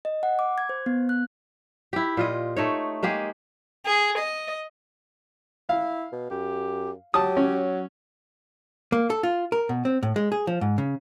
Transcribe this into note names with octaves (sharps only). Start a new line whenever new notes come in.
D#5
F#5
D6
G#6
C5
B3
F#6
E4 G4
A#2 F4 D#5
A3 D#4 C#5
G#3 A#3 G4 G#4
G#4
D#5
E4 F5
B2
F#2 G4
F#3 G4 A5 D#6
C#4
A#3
A4
F4
A#4
B2
C4
A2
G#3
G#4
F3
G#2
C#3